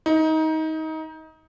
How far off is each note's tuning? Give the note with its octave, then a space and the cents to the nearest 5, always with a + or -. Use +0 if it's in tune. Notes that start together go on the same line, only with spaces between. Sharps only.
D#4 +25